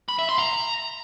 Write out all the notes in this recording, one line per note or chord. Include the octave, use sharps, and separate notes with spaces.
B5
E5
C6
A#5